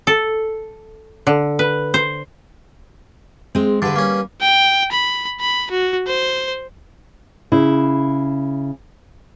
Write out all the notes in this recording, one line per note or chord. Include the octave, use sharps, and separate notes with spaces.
A4
D3
B4
C5
G#3 C4
G2 D3 G3 B4
A#3 C#4
G5
B5
B5
F#4
C5
C#3 E4